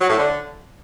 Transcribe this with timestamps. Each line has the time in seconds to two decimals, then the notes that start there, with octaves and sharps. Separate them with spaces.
0.01 F#3
0.10 A2
0.18 D3